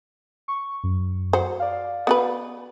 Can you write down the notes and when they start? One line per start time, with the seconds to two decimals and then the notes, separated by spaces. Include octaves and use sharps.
0.48 C#6
0.84 F#2
1.33 F#4 C5
1.60 D5 F5
2.07 B3 F#4 B4